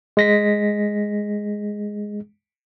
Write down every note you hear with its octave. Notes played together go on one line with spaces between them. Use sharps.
G#3 A#6 B6